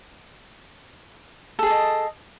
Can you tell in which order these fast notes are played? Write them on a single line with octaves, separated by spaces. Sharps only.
A4 G#4 A5 D#5